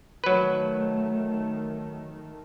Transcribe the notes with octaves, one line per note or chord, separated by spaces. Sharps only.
D#3 F#3 A3 B4